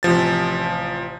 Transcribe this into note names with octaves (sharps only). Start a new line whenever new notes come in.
A1 C3 F3 A6